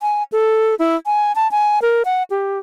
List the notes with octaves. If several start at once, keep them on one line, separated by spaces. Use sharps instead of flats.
G#5
A4
E4
G#5
A5
G#5
A#4
F#5
G4